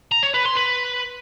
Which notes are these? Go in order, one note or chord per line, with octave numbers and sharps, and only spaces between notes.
A#5
C#5
B4
C6
B4